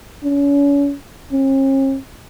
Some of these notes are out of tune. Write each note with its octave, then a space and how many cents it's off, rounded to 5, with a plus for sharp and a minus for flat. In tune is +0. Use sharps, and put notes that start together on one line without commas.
C#4 +35
C#4 -45